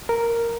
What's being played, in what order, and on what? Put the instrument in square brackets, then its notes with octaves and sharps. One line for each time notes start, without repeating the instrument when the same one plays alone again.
[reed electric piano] A#4